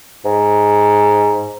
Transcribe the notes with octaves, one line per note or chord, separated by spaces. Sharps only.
G#2